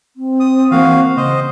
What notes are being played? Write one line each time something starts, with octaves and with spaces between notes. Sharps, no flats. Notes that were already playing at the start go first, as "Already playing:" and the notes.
C4
D#6
E3 A#3 F#4 F5
C#3 C5 D#5